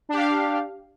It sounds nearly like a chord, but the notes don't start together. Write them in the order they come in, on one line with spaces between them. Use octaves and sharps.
D4 G4 F5